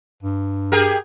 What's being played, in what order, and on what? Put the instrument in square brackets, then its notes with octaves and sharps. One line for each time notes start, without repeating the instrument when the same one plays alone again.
[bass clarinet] G2
[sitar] G4 G#4 A#4